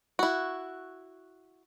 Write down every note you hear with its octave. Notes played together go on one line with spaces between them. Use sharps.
E4 F#4